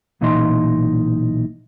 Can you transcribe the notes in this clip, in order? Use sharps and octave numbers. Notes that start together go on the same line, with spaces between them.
B1 A#2 E3 D#4 D#5 C6